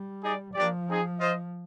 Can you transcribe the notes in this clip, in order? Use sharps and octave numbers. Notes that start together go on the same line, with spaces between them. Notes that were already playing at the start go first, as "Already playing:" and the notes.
Already playing: G3
D#4 G#4 D5
F3 A#3 D4 G4 D5
C4 D#4 G#4
F4 C5 D#5